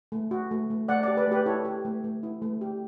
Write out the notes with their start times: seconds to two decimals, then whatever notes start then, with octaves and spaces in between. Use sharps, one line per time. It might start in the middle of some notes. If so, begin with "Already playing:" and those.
0.12 A3
0.31 F#4
0.51 A3
0.70 A3
0.88 A3 D5 F#5
1.03 G4 D5 F#5
1.17 B4 D5
1.27 A3 G4 B4
1.46 E4 A4 C#5
1.65 G4
1.85 A3
2.04 A3
2.23 E4
2.42 A3
2.61 G4